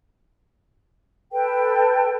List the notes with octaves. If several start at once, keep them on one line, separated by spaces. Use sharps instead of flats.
A4 B4 G5